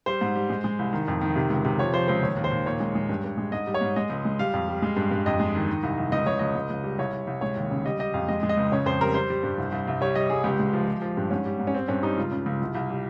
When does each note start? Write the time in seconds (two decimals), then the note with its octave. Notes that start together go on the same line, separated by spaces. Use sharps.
0.06 G3 C5
0.21 G#2
0.35 G3
0.50 G#3
0.64 G#3
0.79 C2
0.93 D#3
1.08 F2
1.21 D#3
1.36 C3
1.50 C#2
1.65 C3
1.79 F3 C#5
1.93 F3 C5
2.08 C#2 C5
2.22 D#2 C#5
2.37 D#2
2.44 C5
2.51 D#2
2.66 A#2 C#5
2.80 G#3
2.95 G#3
3.09 G2
3.24 G2
3.38 G#3
3.52 G#2 D#5
3.67 G3
3.74 C#5
3.81 G#2
3.96 G#3 D#5
4.10 C#2
4.25 G#3
4.39 G3 F5
4.54 F2
4.68 G3
4.82 G#3
4.96 G2
5.11 G2
5.26 F2 D#5
5.40 G#3
5.55 D#3
5.68 D#3
5.83 C2
5.98 C2
6.12 C#2 D#5
6.26 C#2 C#5
6.39 C#2 D#5
6.56 C#2
6.70 C#2
6.84 G3
6.98 C2 C#5
7.13 C2
7.27 C2
7.41 G#3 C#5
7.56 D#2
7.71 C#3
7.86 G3 D#5
7.99 G3 D#5
8.14 F2 F5
8.28 G#3 D#5
8.43 G#3
8.49 D#5
8.57 C#2
8.72 C#3 C#5
8.86 F2 C5
9.01 G3 A#4
9.14 G3 C5
9.30 G3
9.43 G2
9.58 C2
9.72 C2
9.88 C2
10.01 G3 C#5
10.15 G3 D#5
10.30 G3 G#4
10.44 C#2 G4
10.59 G#3
10.73 F3
10.88 F3
11.02 F3
11.17 G2
11.30 G#2 C#4
11.45 G3
11.60 G#2
11.67 C#4
11.74 G3 C4
11.88 G2 C#4
12.03 G3 D#4
12.17 C#2 F4
12.32 C#3
12.46 C#2
12.61 C2
12.75 C2
12.90 G3